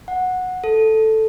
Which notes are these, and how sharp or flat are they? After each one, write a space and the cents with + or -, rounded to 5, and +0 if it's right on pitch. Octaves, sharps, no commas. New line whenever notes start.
F#5 -10
A4 +0